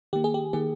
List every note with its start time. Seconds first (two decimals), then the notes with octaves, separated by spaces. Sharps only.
0.13 D#3 A#3 G4
0.24 G#4
0.34 G4
0.53 D#3 A#3 G#4